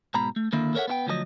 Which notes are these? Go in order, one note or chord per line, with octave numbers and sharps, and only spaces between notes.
G#2 B2 A#5 B5
A3
D3 D#3 A#3 E4
A4 A#4 C#5 D#5 E5 F#5
B3 E4 G5
D2 F3 F#3 G#4 D#5